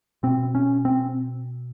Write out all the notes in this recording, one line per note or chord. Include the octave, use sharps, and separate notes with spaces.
B2 C4
C#4
C4